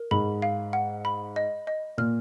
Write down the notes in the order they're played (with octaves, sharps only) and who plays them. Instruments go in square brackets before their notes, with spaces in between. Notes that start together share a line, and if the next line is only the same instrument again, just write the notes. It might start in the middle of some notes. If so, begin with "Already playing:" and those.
Already playing: [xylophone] A#4
[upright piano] G#2 [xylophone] B5
[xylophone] F5
F#5
B5
D#5
D#5
[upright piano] A#2 [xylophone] F6